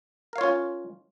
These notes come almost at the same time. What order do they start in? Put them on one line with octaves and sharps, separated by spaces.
A#4 F5 C#5 F4 C#4